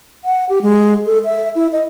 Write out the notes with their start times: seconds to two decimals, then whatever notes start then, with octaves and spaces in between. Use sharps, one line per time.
0.24 F#5
0.49 G4
0.62 G#3
1.06 A4
1.25 E5
1.55 E4
1.72 D#5